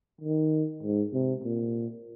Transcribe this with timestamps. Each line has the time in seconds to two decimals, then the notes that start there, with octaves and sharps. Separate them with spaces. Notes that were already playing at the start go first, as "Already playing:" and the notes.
0.21 D#3
0.83 G#2
1.13 C3
1.44 A#2